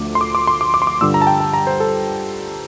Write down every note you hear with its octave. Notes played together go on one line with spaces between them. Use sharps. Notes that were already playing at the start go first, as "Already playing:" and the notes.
Already playing: D2 D3 F3 A3 D6
C6
D6
D6
C6
D6
D6
C6
D6
G2 D3 G3 D4 F4 E6
A#5
A5
G5
A5
A#5
C5
A4